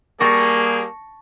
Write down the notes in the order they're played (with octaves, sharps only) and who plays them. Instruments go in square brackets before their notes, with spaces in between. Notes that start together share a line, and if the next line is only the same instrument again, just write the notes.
[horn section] G3 A#3 G#4 [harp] A5 C#6 A#6